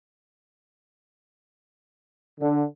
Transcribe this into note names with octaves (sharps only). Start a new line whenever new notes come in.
D3